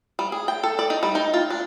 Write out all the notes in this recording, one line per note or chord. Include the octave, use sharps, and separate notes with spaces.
G3
G#4
G5
A4
D5
D#4
G3
D#4
F4
D4